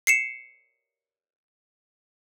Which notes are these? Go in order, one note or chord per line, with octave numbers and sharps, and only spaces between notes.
C7 C#7 E7